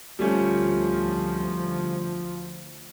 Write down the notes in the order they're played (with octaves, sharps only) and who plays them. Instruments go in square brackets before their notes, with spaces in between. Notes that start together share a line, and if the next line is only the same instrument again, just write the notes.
[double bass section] D2 F3 [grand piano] G3 A3 C#4